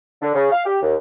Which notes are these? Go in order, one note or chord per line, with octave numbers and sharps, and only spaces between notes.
D3
C#3
F5
G4
D#2